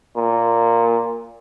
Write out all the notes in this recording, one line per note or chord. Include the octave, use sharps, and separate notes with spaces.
A#2